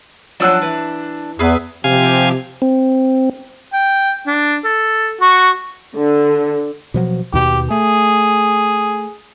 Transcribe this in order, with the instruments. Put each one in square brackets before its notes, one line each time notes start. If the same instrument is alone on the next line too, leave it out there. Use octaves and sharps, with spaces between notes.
[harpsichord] F3 F#3 C#4 [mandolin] D4 E6 F#6
[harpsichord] E3
[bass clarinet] E2 [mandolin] G#4 B4 E5
[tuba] C3 [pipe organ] F3 C4 G4 [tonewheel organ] F5 G#5
[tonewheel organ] C4
[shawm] G5
D4
A4
[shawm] F#4 [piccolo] C#6
[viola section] D3
[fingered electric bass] B2 F3 F#3
[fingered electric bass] D#2 B2 [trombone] G4
[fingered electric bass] A3 [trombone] G#4